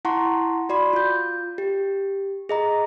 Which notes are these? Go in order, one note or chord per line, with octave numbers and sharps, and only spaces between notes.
E4 F#5 A5 A#5 C6 C#6
F#4 D5 B5 C6
F4 G6
G4
G#4 D#5 A#5